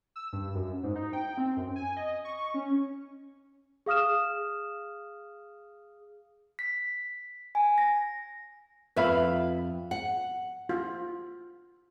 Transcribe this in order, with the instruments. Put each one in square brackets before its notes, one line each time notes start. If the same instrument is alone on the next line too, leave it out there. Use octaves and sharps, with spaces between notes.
[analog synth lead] E6
G2
F#2
G#2
D#4
G5
C4
F#2
G#5
D#5
C#6
C#4
[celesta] G#4 F5 D#6 F6 E7
[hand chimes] B6
G#5
A#6
[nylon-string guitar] F2 F5 [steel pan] B4 E5 B5
[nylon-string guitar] F#5
[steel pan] F4